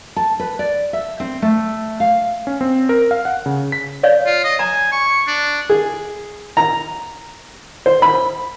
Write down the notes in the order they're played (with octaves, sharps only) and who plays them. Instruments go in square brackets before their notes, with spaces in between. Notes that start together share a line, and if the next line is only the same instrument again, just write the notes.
[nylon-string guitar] A5
B4
D5
E5
C4
A3
F5
[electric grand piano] C#4
C4
A#4
F5
F#5
C#3
B6
[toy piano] C#5 D5 F5
[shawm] F4
D#5
[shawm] G#5 [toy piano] A#5
[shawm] C#6
D4
[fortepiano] G#4
A#5
C5
B5